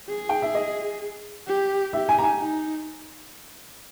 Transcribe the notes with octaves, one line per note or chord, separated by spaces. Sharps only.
G#4
G5
E5
D#5
G4
G4 E5
G#5
A#5
G#5
D#4